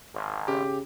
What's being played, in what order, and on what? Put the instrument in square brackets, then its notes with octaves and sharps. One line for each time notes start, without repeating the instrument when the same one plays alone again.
[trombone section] G#1
[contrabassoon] C#3 [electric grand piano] G4